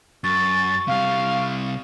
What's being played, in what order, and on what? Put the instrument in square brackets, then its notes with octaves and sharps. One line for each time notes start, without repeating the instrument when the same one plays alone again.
[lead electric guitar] F#2 [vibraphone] C#6 [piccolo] A6
[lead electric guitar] C3 G3 [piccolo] F5